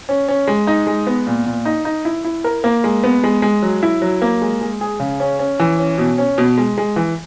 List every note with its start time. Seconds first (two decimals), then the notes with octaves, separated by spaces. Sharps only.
0.09 C#4
0.28 C#4
0.47 G#3
0.67 D#4
0.87 G#3
1.07 B3
1.27 A#2
1.46 A#2
1.65 D#4
1.85 D#4
2.05 E4
2.24 E4
2.44 A#4
2.64 A#3
2.84 G#3
3.04 B3
3.24 G#3
3.42 G#3
3.62 F#3
3.83 E4
4.02 F#3
4.22 A#3
4.42 G#3
4.61 G#3
4.81 G#4
5.00 C#3
5.20 C#4
5.39 C#4
5.60 E3
5.79 C#4
5.98 B2
6.18 C#4
6.38 B2
6.58 G#3
6.78 G#3
6.96 E3